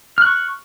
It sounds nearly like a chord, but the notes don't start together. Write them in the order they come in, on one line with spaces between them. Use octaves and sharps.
F6 F#6 C#6